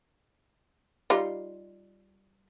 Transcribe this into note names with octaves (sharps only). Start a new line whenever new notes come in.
G3 D#4 F4